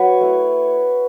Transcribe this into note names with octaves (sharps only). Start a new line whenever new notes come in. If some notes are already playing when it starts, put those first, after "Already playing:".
Already playing: F#3 B4 C#5
A3 E4